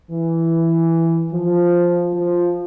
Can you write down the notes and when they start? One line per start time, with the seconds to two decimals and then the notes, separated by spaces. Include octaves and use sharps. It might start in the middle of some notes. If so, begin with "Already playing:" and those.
0.11 E3
1.32 F3
2.13 F3